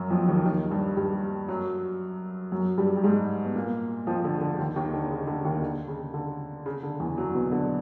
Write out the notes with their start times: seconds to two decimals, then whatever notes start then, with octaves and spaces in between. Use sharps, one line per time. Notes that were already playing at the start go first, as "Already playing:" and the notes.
Already playing: F#2 F#3
0.10 F2 F3
0.28 D#2 D#3
0.45 D#2 D#3
0.71 G2 G3
0.97 G2 G3
1.48 F#2 F#3
2.52 F#2 F#3
2.78 G2 G3
2.96 G3
3.04 G#2 G#3
3.44 B3
3.55 A#2 A#3
4.07 F2 F3
4.24 D3
4.41 D3
4.58 D#2 D#3
4.76 D#2 D#3
4.93 D3
5.11 C#3
5.27 D3
5.45 D#2 D#3
5.62 D3
5.88 C#3
6.14 D3
6.66 C#3
6.83 D3
7.00 E2 E3
7.18 F#2 F#3
7.35 B2 B3
7.52 D3 D4